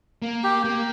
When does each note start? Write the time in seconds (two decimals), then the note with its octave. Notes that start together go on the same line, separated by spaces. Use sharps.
0.22 A#3
0.44 G4
0.65 A#3